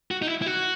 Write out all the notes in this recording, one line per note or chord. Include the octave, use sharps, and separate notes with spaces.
F#4
D#4
E4
E4
F#4